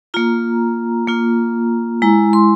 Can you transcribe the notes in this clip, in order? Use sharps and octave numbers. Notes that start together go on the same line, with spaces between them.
A#3 F4 A#5
A#3 F4
G#3 E4 A#5
C6